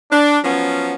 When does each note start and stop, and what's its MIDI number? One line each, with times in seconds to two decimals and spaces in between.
0.11 0.38 62
0.44 0.95 53
0.44 0.95 54
0.44 0.95 59
0.44 0.95 61